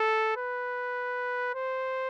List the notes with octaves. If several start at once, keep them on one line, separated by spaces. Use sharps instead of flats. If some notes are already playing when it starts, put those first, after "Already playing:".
Already playing: A4
B4
C5